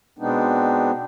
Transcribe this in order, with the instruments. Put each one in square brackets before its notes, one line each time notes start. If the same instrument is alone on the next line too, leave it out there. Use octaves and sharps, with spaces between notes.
[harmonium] B2 G#3 B3 C4 D4 D#4